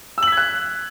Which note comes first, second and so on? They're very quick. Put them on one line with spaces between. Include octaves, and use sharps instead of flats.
E6 F#7 B6 G#6 F#6